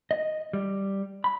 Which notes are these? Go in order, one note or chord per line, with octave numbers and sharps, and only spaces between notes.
D#5
G3
B5